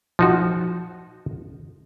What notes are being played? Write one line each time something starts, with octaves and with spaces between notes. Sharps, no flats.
F3 D#4 F#4